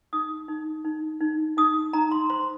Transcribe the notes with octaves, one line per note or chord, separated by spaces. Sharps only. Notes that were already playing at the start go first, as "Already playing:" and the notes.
D#4 D#6
D#4
D#4
D#4
D#4 D#6
D#4 A#5
C6
C5 C6